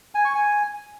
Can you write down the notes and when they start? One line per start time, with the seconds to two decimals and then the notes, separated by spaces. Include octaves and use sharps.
0.15 G#5
0.25 C#6
0.35 G#5